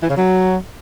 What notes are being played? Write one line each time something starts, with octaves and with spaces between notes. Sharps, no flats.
E3
C#3
F#3